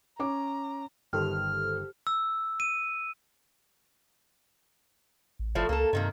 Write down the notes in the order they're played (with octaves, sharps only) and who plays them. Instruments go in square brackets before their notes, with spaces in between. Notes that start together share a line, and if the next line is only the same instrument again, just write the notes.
[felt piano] C#4 C#5 D6 [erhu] A#5
[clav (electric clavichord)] G1 D#3 [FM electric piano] G4 A4 C5 [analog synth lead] F6
[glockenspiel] E6
D#7
[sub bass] A1
[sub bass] G1 [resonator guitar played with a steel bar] A2 F3 A3
[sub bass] C#2 [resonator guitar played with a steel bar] A#3 A4
[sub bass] G2 [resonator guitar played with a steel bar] C3 D#3 A#3